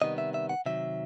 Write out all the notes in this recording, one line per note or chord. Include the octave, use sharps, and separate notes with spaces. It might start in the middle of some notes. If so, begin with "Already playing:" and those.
C3 D#3 G3 B3 D#5
E5
E5
F#5
C3 D#3 F#3 E5